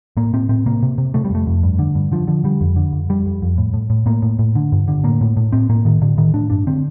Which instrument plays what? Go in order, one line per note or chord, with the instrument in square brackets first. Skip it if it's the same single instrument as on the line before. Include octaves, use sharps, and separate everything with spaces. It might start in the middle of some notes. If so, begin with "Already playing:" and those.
[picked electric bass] A2 A#3
A2 C4
A2 C4
C3 A#3
C3
C3
C3 A3
G3
F2 A3
F2
G2
D3
G2
D3 F3
D3 F3
D3 G3
F2
D3
F2
F2 G3
F2
F2
A2
A2
A2
A2 A#3
A2
A2
D3
G2
D3
A2 A#3
A2
A2
A2 C4
A2 A#3
A2 D#3
A2 D3
A2 D#3
A2 D4
G2 D4
D3 C4